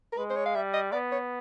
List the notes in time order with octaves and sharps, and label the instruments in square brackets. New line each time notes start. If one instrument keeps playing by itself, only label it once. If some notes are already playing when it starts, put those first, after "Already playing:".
[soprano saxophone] A#4
[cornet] G#3 [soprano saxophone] B4
[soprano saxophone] C5
C#5
F5
[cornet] G3 [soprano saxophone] E5
[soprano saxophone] D#5
[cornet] B3 [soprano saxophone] D5
[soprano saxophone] C#5